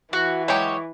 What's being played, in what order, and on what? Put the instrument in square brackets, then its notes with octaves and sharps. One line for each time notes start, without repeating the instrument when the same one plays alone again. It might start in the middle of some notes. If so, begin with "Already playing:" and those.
[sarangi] E3 [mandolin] F#4
[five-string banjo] F#3 G#3 G4 [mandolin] C#5